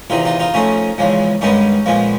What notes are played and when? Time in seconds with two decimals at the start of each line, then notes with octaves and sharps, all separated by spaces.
0.10 E2 C3 D#3 D#4 F4
0.25 D#4 F4
0.39 D#4 F4
0.54 C#3 F3 A3 C#4 D#4
0.98 E2 C#3 F3 G#3
1.41 G2 D#3 G#3 B3 C#4 D#4
1.86 A#2 F3 G#3 B3